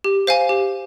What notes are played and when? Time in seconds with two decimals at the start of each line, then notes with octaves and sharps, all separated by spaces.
0.04 G4
0.27 C5 F5 G#5
0.49 G4